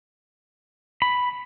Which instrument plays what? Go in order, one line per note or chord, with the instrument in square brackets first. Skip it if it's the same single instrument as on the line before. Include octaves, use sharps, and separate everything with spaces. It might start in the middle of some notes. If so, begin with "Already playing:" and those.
[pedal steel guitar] B5